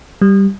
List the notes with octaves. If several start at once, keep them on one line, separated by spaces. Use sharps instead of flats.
G3